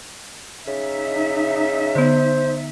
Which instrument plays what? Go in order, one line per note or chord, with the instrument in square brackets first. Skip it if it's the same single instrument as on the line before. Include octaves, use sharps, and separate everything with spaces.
[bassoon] C#3 [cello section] D#4 E5
[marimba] D3 B3 [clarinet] C5